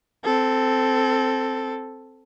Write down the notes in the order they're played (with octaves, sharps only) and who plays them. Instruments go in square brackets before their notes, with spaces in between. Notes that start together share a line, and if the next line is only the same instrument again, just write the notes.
[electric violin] C4 A4